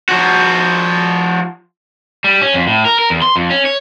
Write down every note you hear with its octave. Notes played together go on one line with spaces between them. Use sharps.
F3 F#4
G3
C#4
F2
A2
A#4
A#4
E2
C6
F2
C#4
C#5